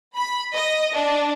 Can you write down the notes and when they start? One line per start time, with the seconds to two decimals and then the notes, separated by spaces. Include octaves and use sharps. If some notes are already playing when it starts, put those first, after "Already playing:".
0.16 B5
0.55 D#5
0.95 D4